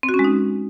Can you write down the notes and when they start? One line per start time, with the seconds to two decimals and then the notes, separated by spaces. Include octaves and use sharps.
0.03 C4
0.09 F#4
0.14 C#4
0.19 G#3
0.24 D#4